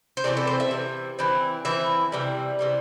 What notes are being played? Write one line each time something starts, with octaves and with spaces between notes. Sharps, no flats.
C5
C3 E3 A3 C4 D5
A4
C5
E5
C3 E3
E3 C4 E4
E3 C4 E4 E5
C3 E3 G3
C3 E3 G3